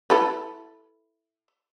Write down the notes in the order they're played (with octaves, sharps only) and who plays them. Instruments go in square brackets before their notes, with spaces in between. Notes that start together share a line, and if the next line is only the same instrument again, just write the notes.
[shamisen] E4 A4 B4